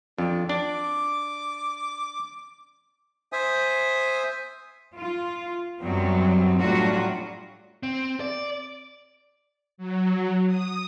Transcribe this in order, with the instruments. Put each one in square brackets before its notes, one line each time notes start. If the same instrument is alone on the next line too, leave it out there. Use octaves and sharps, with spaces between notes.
[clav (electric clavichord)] F2 [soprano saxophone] D4
[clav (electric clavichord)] D4 [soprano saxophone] D6
[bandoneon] C5 E5 G#5 D#6
[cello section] F4
F#2 F#3 G3 B3 C4
A2 F#3 G3 D4 F4 F#4
[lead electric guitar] C4
D5
[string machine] F#3
D#6